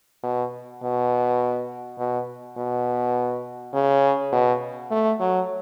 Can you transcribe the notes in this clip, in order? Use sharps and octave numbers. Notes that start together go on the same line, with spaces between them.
B2
B2
B2
B2
C#3
B2
A3
F#3